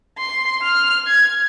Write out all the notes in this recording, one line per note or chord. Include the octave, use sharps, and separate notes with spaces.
C6
F6
G#6